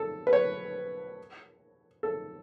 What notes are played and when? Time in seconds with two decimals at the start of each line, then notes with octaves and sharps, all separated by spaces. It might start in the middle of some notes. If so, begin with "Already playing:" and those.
Already playing: A4
0.27 B4
0.33 C#5
2.03 A4